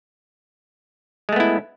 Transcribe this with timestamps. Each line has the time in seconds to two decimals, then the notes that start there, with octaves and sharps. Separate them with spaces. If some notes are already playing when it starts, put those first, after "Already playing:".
1.29 G#3
1.33 A3
1.36 B3
1.40 E4